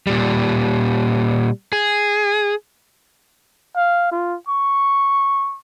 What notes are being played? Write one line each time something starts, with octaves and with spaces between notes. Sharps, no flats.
A#2 G3
G#4
F5
F4
C#6